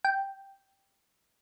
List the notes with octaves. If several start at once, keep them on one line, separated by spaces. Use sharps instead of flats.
G5